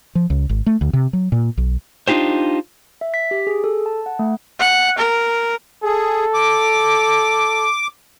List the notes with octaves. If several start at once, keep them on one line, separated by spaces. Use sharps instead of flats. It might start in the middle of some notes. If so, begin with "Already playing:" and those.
F3
C#2
G#1
A3
D2
C3
F#3
A#2
B1
D4 D#4 F4 G4 C5
E5
B6
G4
G#4
A4
A5
F#5
A3
F#5
A#4
G#4 A4
D6